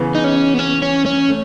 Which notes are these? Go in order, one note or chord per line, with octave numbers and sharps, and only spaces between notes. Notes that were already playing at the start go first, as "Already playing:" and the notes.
Already playing: C#3 E3 B3
D#4
C#4
B3
C#4
C#4
C#4
A3